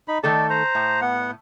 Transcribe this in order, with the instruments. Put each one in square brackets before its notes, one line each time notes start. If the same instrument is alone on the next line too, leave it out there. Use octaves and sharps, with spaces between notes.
[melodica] D#4 B5
[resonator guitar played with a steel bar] D#3 A3 A4 [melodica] D5
[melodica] C5 A#5
[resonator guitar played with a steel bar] A2
[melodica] B3 F#5